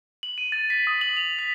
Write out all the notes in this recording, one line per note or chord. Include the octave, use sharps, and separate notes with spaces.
F#7
D#7
A6
B6
D#6
F#7
F7
B6